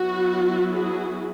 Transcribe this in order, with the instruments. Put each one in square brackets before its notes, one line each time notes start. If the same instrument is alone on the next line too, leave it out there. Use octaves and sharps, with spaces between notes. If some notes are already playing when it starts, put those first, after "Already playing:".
Already playing: [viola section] F#3 B3 E4 F#4
F#4 G#4